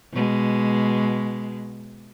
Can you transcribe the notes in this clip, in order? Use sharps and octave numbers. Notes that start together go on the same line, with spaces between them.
B2 G#3